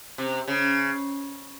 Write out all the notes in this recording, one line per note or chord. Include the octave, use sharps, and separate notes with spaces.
C3
C#3